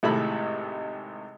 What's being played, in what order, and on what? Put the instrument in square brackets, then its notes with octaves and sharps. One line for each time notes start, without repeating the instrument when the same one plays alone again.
[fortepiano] G#1 A2 C3 G#3 A4 B5